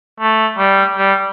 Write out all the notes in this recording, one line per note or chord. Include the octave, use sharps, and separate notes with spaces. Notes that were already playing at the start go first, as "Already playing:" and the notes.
A3
G3
G3